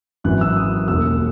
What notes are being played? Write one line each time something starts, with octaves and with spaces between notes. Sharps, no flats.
G#1 F#2 E3 F#6
E6
D#6
E1 D#2 D#3 E6